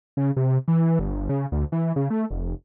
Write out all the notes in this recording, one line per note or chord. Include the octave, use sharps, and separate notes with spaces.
C#3
C3
E3
G1
C#3
D2
E3
C#3
A3
F1